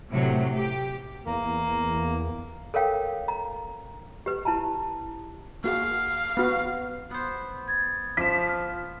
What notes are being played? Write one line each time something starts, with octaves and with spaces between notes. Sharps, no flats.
A2 C3 F#3
G4
E2 A#3
A4 A#4 C#5 F5 G5
A#5
G4 B4
E4 A5 A#5
A#3 F#4 G#4 F5
B3 F#4
B3 C5
G#6 A6
F3 D6 B6 E7
F6